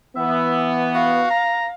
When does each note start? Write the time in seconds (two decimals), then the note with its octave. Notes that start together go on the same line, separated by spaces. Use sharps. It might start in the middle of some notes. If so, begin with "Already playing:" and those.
0.16 E3 B3 E5
0.94 F#4 F5
1.30 A#5